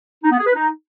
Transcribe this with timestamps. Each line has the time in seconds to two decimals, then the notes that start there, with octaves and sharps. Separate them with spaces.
0.24 D#4
0.31 B3
0.39 G#4
0.47 B4
0.54 D#4